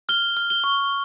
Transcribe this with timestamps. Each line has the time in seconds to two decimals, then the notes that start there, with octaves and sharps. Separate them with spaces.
0.09 F6 G7
0.37 F6
0.50 G7
0.64 C#6